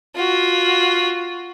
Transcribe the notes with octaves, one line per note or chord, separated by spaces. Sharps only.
F4 F#4